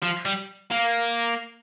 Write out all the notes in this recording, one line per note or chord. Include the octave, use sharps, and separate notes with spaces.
F3
G3
A#3